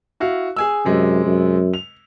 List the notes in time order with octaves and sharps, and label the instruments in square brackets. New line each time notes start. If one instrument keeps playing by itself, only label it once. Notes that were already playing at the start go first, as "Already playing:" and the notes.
[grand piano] E4 F#4 F5
G#4 G#5 E6
[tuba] F#2 [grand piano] C3 G#3
[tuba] F#2
[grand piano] F7